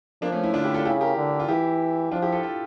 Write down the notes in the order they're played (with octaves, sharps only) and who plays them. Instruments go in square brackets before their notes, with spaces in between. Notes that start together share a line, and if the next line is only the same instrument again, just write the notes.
[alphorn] F3 [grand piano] A#3 D4
[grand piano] A3 C#4
C#4 E4
[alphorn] D3 [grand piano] D4 F4
[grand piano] E4 G4
F4 A4
[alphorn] C#3 [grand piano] E4 G4
[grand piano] G4 A#4
[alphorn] D3
[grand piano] F4
[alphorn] E3 [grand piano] E4 G4
[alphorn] F3 [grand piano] D4 F4
[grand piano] E4 G4
F4 A4
F4 A4